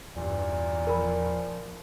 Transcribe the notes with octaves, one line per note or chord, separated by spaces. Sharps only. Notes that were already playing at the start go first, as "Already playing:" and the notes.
E2 G2 A#2
F3 A#4 B5